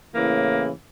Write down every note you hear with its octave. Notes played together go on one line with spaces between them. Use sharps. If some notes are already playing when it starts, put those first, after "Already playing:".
A2 C#3 E3 A#3